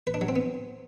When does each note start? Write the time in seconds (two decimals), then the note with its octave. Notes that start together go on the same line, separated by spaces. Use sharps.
0.07 B4
0.14 D4
0.21 F#3
0.28 C4
0.36 B3